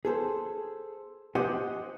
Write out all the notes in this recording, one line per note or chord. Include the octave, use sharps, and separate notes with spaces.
G#4 A4 C5
G4 C5 D#5 F#5